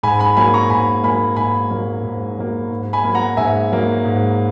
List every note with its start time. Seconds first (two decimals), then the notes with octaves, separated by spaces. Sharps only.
0.03 G#2 G#5 B5
0.19 G#5 B5
0.37 F#3 A#3 G#5 B5
0.54 A#5 C#6
0.70 G#2 G#5 B5
1.04 F#3 A#3 G#5 B5
1.36 G#2 G#5 B5
1.71 F#3 A#3
2.04 G#2
2.38 F#3 A#3
2.70 G#2
2.93 G#5 B5
3.04 F#3 A#3
3.15 F#5 A#5
3.37 G#2 E5 G#5
3.72 F#3 A#3
4.05 G#2